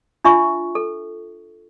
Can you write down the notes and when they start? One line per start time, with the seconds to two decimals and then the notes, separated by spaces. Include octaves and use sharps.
0.24 D4 F4 E5 C#6
0.75 A4